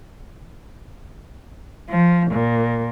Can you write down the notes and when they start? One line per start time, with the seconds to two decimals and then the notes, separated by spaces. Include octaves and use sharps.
1.90 F3
2.32 A#2